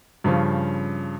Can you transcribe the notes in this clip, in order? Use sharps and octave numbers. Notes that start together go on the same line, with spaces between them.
G2 C#3 F3 C#4